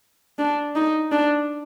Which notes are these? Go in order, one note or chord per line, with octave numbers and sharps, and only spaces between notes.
D4
D#4
D4